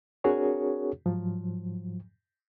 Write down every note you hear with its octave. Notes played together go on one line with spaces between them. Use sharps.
C4 D4 F#4 G#4 A#4 C#5
G#2 F3 F#3